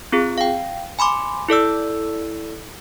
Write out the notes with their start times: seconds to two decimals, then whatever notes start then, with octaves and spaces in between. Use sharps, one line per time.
0.12 C4 F4 G#4
0.38 F5 G5
0.99 G#5 B5 C6 D6
1.49 E4 A4 D5 E6